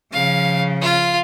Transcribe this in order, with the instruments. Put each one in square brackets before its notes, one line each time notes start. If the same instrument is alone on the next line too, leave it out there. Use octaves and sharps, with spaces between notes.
[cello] C#3 F3 [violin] F5
[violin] F4 F5